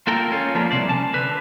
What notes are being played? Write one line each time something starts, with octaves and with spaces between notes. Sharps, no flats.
A#3 F4 A4 A#4 G5
C#4 F4
F3 G#3 A#3 B3 D4
C2 G2 C3 C5 D5
C#4 A5
D3 B4